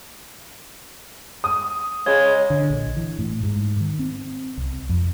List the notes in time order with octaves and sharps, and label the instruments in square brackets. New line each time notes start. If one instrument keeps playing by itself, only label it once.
[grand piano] D#6
[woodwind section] C#3 G#3 [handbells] C#5
[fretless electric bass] D3
A#1
E3
A2
G#2
D#3
C4
C2
F2